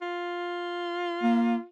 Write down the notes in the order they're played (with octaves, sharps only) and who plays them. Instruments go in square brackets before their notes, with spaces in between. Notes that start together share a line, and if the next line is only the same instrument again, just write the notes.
[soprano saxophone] F4
[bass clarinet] A#3